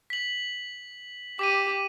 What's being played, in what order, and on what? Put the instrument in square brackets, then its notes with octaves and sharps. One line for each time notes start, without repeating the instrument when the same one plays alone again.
[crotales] B6 F#7
[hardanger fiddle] G4 [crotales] D6 B6 D#7